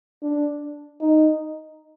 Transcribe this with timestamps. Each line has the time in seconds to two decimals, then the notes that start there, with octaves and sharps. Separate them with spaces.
0.22 D4
1.01 D#4